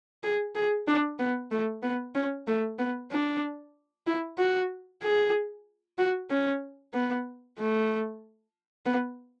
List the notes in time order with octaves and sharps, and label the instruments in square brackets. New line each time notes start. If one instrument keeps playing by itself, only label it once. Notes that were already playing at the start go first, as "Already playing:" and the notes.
[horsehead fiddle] G#4
G#4
D4
B3
A3
B3
C#4
A3
B3
D4
E4
F#4
G#4
F#4
C#4
B3
A3
B3